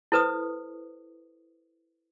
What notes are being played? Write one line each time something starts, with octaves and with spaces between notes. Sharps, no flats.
E4 A4 B4 C5 D#6